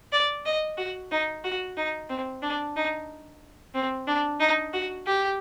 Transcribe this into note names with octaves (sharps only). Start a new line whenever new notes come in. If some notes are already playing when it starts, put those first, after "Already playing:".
D5
D#5
F#4
D#4
F#4
D#4
C4
D4
D#4
C4
D4
D#4
F#4
G4